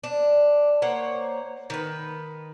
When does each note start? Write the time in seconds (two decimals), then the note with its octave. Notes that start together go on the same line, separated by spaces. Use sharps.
0.04 D4
0.82 A#3 C5 C#5 F#5
1.70 D#3 B4